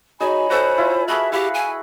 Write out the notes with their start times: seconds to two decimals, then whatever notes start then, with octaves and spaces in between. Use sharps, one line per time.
0.21 D#4 F#4 G#4 C#5 G#5 B5
0.50 F#4 A4 C5 F#5
0.78 E4 F4
1.08 F#4 G#4 B4 E5 A5 B5
1.32 E4 G4 F5 F#5 B5
1.54 G#5